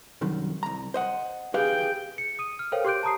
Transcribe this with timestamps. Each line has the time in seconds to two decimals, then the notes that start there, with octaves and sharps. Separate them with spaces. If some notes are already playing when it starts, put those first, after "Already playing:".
0.21 C2 F#2 D#3
0.63 C2 A#5
0.94 C5 D#5 F#5
1.54 G4 G#4 B4 F5 G5
2.18 C#7
2.39 D#6 D#7
2.59 F6
2.72 A4 A#4 C5 C#5 F5 G5
2.85 G4 C6 D6 F#6 G6 D7
3.03 A5 A#5 D#6 C7